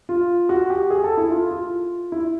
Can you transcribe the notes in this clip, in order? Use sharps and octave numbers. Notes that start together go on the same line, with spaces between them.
F4
F#4
G4
G#4
A4
E4
F4
F4
E4